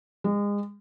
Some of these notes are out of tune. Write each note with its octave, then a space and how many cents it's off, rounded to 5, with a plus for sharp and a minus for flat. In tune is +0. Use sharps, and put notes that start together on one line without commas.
G#3 -30